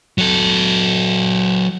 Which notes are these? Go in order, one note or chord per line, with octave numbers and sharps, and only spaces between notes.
F#3 A4